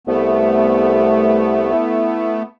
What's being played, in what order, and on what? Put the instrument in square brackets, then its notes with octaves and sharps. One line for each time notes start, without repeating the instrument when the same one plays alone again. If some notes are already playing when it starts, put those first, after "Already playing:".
[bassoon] C2 [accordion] A3 B3
[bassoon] E4